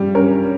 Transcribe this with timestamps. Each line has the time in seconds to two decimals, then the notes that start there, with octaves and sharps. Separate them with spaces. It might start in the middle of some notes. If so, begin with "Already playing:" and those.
Already playing: G2 G3 G4
0.15 C#4 A#4 C#5